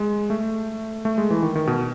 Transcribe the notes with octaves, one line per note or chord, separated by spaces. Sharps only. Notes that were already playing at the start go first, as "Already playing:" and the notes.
Already playing: G#3
A3
A3
G#3
E3
D#3
D#3
B2